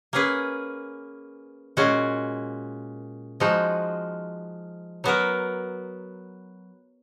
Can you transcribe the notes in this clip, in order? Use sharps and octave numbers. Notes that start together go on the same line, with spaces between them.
A#3 C#4 G#4 B4
A#2 G#3 C#4 F#4
F3 G#3 D#4 F#4
F#3 B3 F#4 A#4